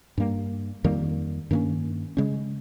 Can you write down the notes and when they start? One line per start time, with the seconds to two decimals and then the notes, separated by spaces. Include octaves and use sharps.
0.18 G2 G3 A#3
0.84 F2 D#3 G3 A#3
1.51 G2 D#3 A#3 C#4
2.17 C#3 G#3 C#4